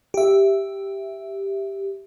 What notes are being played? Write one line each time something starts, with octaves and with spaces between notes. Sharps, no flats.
G4 E5